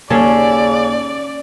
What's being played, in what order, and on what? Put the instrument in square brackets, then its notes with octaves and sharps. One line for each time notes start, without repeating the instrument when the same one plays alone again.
[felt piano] D#2 [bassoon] C#3 [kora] C#4 G#4 A4 [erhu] D5